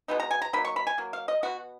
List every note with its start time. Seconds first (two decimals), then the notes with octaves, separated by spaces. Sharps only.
0.08 B2 G#3 B3 D#4
0.20 A#5
0.31 G#5
0.42 A#5
0.53 F#3 A#3 D#4 B5
0.65 C#6
0.76 B5
0.87 G#5
0.98 F#3 A#3
1.13 F5
1.28 D#5
1.43 B2 F#3 B3 F#4